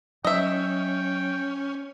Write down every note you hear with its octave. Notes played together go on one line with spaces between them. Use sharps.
F#3 C#4 D#5 E5 G5